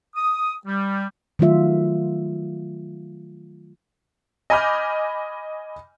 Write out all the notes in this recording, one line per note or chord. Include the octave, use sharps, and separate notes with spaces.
D#6
G3
D#3 F#3 A3 F4 E5
D#5 G#5 B5 D6 F6 G6